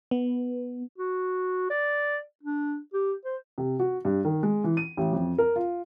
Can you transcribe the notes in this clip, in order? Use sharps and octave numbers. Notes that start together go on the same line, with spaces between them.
B3
F#4
D5
D4
G4
C5
C3
F#4
G2
D#3
G#3
E3
D#7
A1
F2
A#4
F4